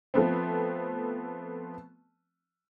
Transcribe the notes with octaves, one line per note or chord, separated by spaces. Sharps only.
F3 A3 B3 C4